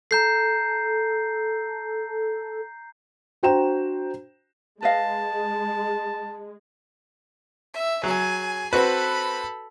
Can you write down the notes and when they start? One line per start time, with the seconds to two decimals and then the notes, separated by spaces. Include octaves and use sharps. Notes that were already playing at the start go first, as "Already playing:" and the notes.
0.11 A4 A#5 G6 C7
3.43 D4 F#4 C5 G5 A#5 E7
4.83 G#3 B4 D#5 F5 A5
7.74 E5
8.04 F#3 G#4 G#5
8.73 C4 F#4 A4 B4 B5